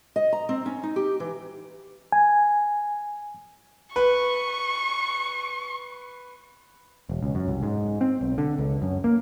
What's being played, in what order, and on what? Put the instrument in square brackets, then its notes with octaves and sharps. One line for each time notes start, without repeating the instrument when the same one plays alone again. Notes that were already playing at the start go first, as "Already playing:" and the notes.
[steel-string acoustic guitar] D#5
A#5
C4
C#4
D#4
G4
E3
[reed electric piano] G#5
[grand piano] B4 [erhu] C#6
[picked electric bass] E1
C#2
F#2
C2
G#2
C4
B1
D3
C#2
F#2
A#3